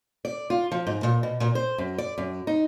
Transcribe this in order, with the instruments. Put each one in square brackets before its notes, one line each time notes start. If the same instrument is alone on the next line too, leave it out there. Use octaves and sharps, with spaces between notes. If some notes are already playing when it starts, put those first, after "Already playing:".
[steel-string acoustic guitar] D5
F4
F3
G#2
A#2
B2
A#2
C5
F#2
D5
F#2
D#4